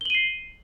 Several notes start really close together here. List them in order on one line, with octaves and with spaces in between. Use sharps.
G7 F#7 D#7 C7